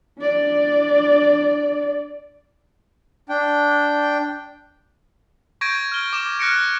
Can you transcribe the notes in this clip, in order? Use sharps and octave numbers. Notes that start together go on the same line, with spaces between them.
D4 D5
D4 G5
C#6 G6 G#6 A#6 D7 D#7
F6 G7
D6 E7
F6 F#6 A#6 C#7 D7